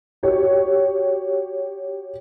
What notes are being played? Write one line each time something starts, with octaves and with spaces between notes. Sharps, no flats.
F#4 G4 C#5